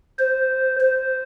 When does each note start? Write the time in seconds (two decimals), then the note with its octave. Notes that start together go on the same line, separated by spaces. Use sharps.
0.19 C5
0.80 C5